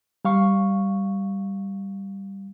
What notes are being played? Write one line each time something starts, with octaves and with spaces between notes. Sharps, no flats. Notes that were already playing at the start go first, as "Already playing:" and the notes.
G3 F5 C#6